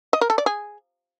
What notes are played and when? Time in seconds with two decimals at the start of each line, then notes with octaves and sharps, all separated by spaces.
0.13 D#5
0.21 A#4
0.30 A4
0.38 D5
0.46 G#4